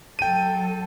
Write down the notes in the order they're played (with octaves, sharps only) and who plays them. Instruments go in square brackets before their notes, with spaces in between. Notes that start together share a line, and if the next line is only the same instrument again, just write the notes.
[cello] F#3 A4 [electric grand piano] G5 D#7